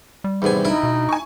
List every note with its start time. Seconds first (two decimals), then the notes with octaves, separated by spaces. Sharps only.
0.24 G3
0.42 E2 A2 C3 D#3 B3 G#5
0.65 D2 D#4 E4 E5
0.83 B2
1.09 G#5 C#6